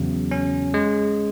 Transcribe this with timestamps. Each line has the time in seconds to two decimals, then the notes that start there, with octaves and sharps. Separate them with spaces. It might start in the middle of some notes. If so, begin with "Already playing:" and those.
Already playing: E2 C#3 F#3
0.31 C#4
0.74 G#3